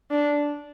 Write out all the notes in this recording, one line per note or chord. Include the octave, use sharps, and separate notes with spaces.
D4